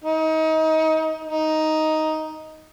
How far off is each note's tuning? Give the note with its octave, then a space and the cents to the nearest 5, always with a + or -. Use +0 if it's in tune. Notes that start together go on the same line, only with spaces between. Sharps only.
D#4 +30
D#4 +5